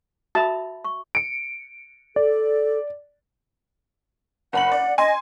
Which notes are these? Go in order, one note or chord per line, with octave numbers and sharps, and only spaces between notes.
F#4 E5 A5 B5
C#6
C#7 D7
A4 D5
F#1 F#5 B5 F#7
D5
D#5 G#5 C6